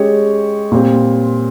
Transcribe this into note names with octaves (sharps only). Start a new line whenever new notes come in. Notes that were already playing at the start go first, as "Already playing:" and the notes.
Already playing: G#3 C#4 G4 C#5
A#2 G3 C4